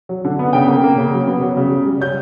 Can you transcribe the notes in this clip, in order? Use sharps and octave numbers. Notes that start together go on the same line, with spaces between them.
F#3
D3
B3
C#3 G5
A#3
A#3
C#3
F#3
B3
F#3
C#3
G3
G3
C#4 G6